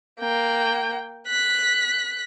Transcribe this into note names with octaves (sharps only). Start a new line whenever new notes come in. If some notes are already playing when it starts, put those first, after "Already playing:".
A#3 G5
F#6 B6